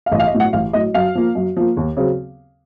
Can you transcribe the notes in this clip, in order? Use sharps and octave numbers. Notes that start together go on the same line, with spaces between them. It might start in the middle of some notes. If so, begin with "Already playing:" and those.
F5
A1 D#5
F5
D#5
A2 F#3
F#4 F#5
A1 F5
A2 F#3 D#5
F#2 F5
F3 A#3
F#2
F3 A#3
D#2
C#3 F#3 C4